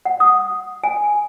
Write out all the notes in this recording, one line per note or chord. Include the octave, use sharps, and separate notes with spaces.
F#5
D#6
G#5